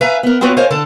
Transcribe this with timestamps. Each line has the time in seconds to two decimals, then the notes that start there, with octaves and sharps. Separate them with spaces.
0.01 B4 E5 F5 G#5 A#5
0.23 B3 A#4
0.41 B3 C4 F4 F#4 B4 C#5
0.57 A#4 C5 C#5 D#5 F5 G#5
0.70 D3 A4 A5